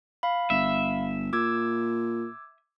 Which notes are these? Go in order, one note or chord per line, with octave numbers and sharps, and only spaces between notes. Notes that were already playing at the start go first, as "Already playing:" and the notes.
F5 B5
G1 E5
A#2 D6 E6 G#6